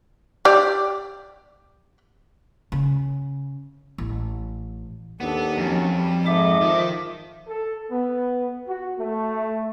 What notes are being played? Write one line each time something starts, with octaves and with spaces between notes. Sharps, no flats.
G4 D5
C#3
A1
D#2 B3 D4 A4
F2 F#3 C#4
G3 B5
G#2 A4 D#5 E5 D6
D#3 F3
A4
B3
F#4
A3